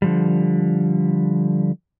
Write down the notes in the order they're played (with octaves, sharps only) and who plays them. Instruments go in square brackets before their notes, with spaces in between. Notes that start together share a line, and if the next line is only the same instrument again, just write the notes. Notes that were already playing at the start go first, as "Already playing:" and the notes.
[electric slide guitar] D3 F3 G3